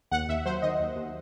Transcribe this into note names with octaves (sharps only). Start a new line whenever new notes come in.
D#2 F#5
D#2 E5
F#3 C5
D#3 D#5
D#2
D#2